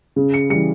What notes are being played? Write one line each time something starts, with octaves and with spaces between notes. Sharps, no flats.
C#3
C#7
E3 G3 C#7